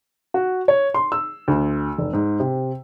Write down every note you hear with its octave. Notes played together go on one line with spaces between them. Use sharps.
F#4
C#5
C6
E6
D2
F1
G#2
C3